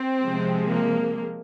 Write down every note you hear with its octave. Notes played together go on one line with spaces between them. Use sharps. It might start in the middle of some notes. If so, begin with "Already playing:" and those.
Already playing: C4
C3 F3 G#3
A#3